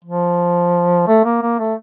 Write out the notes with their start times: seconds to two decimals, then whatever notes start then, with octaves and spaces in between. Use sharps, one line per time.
0.04 F3
1.07 A3
1.25 A#3
1.42 A#3
1.59 A3